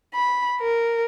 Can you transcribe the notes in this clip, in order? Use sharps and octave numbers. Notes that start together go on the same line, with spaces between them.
B5
A#4